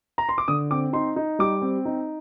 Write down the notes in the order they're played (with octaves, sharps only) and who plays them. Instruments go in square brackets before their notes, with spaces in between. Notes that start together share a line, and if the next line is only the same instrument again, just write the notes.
[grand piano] A#5
C6
D6
D3 D#6
C4 D6
D#4 C6
D#4
G3 D6
C4
D#4